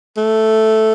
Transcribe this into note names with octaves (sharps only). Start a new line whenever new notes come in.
A3